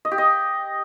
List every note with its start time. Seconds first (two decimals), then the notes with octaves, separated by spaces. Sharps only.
0.05 D#5
0.11 G4
0.18 D#5